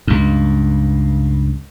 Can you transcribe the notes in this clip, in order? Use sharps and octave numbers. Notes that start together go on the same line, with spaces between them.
C#2 G2